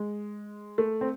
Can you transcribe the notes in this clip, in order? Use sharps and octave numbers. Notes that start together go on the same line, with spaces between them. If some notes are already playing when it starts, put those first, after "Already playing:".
Already playing: G#3
A3
C4